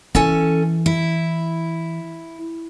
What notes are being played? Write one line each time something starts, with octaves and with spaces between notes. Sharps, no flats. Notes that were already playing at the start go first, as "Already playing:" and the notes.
E3 C#4 A4 G#5
E4